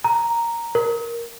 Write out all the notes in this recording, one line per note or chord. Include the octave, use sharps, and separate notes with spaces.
A#5
A#4